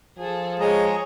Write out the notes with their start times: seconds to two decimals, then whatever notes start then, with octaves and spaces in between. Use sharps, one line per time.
0.18 F3 G#4 A4
0.60 G#3 G#4 C#5 A#5